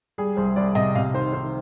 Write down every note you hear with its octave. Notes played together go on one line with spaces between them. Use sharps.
G3 G#4
C2 C5
C2 D5
C3 D#5
C3 F5
D#3 C5
D#3 C5